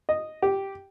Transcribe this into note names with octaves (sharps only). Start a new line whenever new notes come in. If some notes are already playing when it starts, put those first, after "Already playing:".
D#5
G4